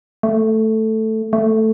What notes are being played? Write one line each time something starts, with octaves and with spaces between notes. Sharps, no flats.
A3
A3